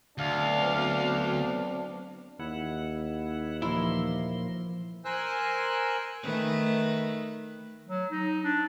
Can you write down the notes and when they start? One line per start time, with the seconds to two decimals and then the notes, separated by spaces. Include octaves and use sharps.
0.18 D2 F#3 B3 C4 D4 F5
2.40 D#2 E4 F#5
3.62 A#2 E3 F3 A3 A#3 E4 C6
5.05 A#4 C5 G#5 E6 F#6
6.23 D#3 A3 B4
7.88 F#3
8.12 D#4
8.44 D4